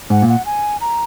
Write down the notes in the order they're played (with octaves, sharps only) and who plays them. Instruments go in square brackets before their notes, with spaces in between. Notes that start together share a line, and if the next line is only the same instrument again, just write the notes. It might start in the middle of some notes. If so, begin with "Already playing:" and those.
[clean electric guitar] G#2 [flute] F#5
[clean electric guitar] A#2
[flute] F#5
G#5
A#5